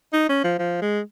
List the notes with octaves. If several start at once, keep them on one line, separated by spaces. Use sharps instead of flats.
D#4
C#4
F3
F3
G#3